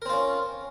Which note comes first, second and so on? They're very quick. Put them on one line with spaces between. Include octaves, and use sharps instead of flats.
A#4 C4 F4 C#4